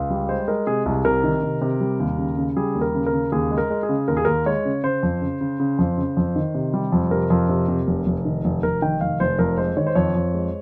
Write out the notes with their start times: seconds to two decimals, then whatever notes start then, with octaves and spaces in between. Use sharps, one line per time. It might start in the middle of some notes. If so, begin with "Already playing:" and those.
Already playing: C#2
0.10 G3
0.29 G#3 C5
0.48 G#3 A#4
0.67 C3 G#4
0.86 C2 G#4
1.05 C3 A#4
1.24 D#3
1.43 C3
1.62 C3
1.81 G3
2.00 D#2
2.18 C#3
2.37 C#3
2.56 G3 G#4
2.75 D#2
2.81 A#4
2.95 C#3
3.07 A#4
3.13 C#3
3.32 D#2 G#4
3.51 G#3
3.58 A#4
3.70 G#3
3.83 G#4
3.89 C#3
4.08 D#2 A#4
4.17 G#4
4.25 D#2 A#4
4.46 G#3 C#5
4.65 C#3
4.84 C#3 C5
5.03 F2
5.22 C#3
5.41 C#3
5.60 C#3
5.79 F2
5.98 C#3
6.17 F2
6.36 D#3
6.55 C3
6.74 G3
6.92 F2
7.11 C3 A#4
7.30 F2
7.49 C3
7.68 C3
7.87 F1
8.06 F1
8.25 D#3
8.44 F1
8.63 F1 A#4
8.82 D#3 G5
9.01 F1 F5
9.20 F1 C5
9.39 F2 A#4
9.58 G#3 C5
9.77 D#3 C#5
9.86 C5
9.95 F2 C#5
10.15 F2
10.34 G#3